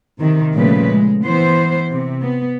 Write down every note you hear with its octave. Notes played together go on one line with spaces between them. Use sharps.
C3 D#3
A#2 C#3 F3 G3 A3 B4
G#3
E3 B3 C5
C3
B3